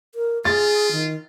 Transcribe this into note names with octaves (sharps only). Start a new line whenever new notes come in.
A#4
F4 G#4 A6
D#3